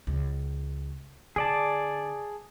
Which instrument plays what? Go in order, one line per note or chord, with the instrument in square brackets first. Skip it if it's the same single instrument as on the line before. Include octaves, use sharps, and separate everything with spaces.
[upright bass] C#2
[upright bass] D3 [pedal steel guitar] G#4 D5 A5